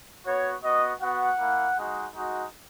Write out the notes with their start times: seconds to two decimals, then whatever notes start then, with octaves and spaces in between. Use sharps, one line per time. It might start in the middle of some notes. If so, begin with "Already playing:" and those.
0.25 B3 F#4 C#5
0.63 B3 F#4 D#5
1.00 B3 F#4 F#5
1.38 A#3 E4
1.76 G#3 D#4 F#4
2.14 G#3 D#4 F#4